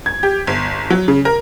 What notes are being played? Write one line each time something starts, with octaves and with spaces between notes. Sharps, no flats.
G#6
G4
G1
F#3
C#3
A#4